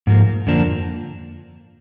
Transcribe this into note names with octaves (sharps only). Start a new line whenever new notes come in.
G#2 F3 A#3
F2 D3 F3 A#3 D4